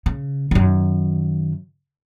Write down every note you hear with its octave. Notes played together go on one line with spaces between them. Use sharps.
C#3
F#2 D#3